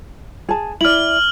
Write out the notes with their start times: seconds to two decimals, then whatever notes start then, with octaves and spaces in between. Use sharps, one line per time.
0.49 G#4 A5
0.81 E4 D5 F6 F#7